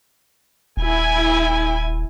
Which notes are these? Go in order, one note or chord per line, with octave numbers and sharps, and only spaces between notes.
D#1 E4 G#5